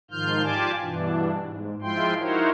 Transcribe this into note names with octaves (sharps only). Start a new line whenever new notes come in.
G#2 D#3 F3 F4 F6 G6
F4 G4 D5 G#5 A5 D6
G2 B2 E3 D4
G#2
F3 G#3 E4 F4 G5 C6
D#4 E4 F#4 A#4 C5 C#5